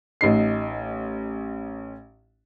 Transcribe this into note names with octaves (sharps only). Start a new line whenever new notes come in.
A1 D#4 C7